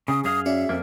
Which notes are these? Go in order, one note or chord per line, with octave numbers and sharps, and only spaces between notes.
C#3 D#6
F#2 G#4 F5 D#6
C#4 F#4 D5 E5
F2 A#3